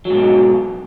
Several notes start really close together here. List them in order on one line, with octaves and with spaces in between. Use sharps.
F#3 G#2 B2